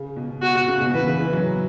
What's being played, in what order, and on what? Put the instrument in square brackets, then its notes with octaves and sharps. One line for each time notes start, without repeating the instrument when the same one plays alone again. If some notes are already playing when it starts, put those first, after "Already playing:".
Already playing: [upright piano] C#3
B2
[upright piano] B2 [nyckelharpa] F#4
[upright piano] B2
C#3
B2
[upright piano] E3 [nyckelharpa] B4
[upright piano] C#3
E3
F#3